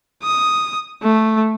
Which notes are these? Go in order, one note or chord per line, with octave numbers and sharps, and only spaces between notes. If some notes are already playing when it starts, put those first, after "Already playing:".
D#6
A3